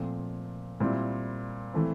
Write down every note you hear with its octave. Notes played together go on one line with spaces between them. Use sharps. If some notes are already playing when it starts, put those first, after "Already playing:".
Already playing: A#2 F3 A3 C4
A#2 G3 C4 E4
E3 A3 C4